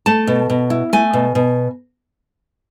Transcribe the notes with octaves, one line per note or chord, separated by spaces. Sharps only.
A3 A5
B2
B2
E4
A3 G#5
B2
B2